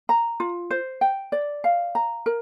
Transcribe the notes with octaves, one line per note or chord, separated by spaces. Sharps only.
A#5
F4
C5
G5
D5
F5
A#5
A#4